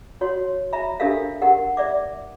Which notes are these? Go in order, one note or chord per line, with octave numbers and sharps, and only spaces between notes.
F#4 C#5 C6
E5 A#5 B5
D4 G4 A4 A#4 E5 F5
G4 A#4 F#5
D5 E5 D6